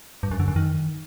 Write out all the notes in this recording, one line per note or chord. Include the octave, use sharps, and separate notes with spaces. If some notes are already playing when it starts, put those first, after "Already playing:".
G2
F#2
D3
F#2
D#3